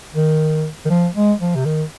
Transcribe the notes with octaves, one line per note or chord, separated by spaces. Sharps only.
D#3
D#3
F3
G#3
F3
C3
D#3